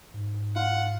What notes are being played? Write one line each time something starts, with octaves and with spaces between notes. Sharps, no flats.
G#2
F4 F#5